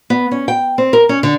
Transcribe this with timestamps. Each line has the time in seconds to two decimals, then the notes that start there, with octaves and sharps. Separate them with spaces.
0.10 B3
0.31 C#4
0.48 G5
0.78 C4
0.93 A#4
1.09 C#4
1.23 D3